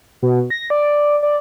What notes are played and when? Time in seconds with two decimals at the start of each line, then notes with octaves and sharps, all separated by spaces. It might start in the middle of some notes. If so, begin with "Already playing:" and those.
0.22 B2
0.50 A#6
0.70 D5
1.23 D5